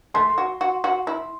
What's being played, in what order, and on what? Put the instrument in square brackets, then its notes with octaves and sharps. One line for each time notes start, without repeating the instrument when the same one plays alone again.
[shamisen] A3 [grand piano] C6
[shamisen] F#4
F#4
F#4
E4